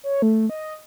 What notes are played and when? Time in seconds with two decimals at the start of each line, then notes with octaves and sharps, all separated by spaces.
0.04 C#5
0.22 A3
0.50 D#5